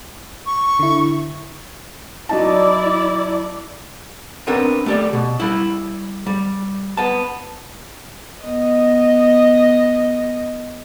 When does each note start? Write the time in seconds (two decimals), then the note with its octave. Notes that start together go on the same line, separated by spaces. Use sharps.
0.46 C#6
0.79 D3 E4
2.29 F#3 D#4 E4 D5 A5
4.47 B3 C4 D4 A4 A#4
4.86 A3 G4 D5
5.13 B2
5.40 G3 E4
6.26 G3
6.97 B3 A5
8.42 B3 D#5